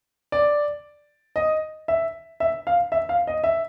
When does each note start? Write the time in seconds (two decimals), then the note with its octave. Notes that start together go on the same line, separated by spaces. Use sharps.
0.32 D5
1.36 D#5
1.88 E5
2.40 E5
2.67 F5
2.92 E5
3.09 F5
3.27 D#5
3.44 E5